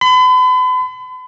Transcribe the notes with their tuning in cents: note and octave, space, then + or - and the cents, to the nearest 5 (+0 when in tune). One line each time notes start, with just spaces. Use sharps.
B5 +40